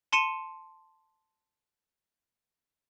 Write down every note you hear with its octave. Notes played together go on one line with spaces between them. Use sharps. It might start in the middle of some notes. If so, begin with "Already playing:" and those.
A5 C6 C#7 D#7 E7